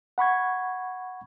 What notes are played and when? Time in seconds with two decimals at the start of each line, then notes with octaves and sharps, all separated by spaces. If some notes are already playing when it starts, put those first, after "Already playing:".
0.18 F#5 B5 C#6 G#6